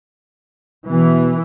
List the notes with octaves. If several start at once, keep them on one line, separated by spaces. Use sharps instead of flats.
B2 E3